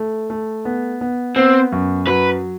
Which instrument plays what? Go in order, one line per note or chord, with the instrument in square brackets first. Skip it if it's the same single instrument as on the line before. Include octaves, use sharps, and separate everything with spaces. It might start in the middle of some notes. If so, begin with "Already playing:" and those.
Already playing: [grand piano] A3
A3
B3
B3
[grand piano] B3 [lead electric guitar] C4
[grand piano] F#2
[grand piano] F#3 [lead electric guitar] B4